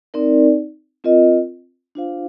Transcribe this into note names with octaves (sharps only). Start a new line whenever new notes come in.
C4 D#4 A#4 D5
C4 F4 A#4 D#5
D4 F4 C5 F5